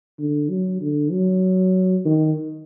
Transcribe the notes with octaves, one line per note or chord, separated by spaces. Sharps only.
D3
F#3
D3
F#3
D#3